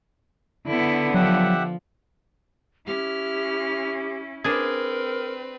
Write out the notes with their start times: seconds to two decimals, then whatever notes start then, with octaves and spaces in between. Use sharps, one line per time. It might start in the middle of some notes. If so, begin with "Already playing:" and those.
0.67 D3 B3 E4
1.14 F3 F#3 G4 E5 F#5
2.87 C#4 E4 G4 F6
4.44 C4 D4 G#4 A#4 B4